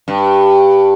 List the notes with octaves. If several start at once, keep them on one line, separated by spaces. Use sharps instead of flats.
G2